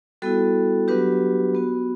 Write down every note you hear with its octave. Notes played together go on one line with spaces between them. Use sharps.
G3 B3 E4 F#4 A4
F#3 B3 D4 F#4 G4 B4
B3 F#4